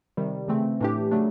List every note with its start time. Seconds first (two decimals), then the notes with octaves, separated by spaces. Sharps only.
0.17 C3 D#3 G3
0.48 C#3 E3 A3 C4
0.80 A2 E3 A3 D4 G4
1.11 C#3 F#3 A3 D4